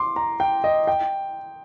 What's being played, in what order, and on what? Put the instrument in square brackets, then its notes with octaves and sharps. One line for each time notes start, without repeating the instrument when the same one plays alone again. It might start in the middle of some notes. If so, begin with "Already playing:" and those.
Already playing: [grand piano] C6 D6
A#5
G5
D#5
G5